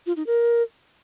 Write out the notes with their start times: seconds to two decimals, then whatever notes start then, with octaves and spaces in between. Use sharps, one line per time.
0.06 F4
0.17 D#4
0.27 A#4